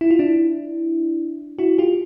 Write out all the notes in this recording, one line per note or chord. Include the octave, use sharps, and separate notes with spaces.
E4
F4
D4 E4
E4 F#4
F4 G4